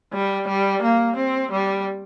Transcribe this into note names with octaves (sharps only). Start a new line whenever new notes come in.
G3
G3
A#3
C4
G3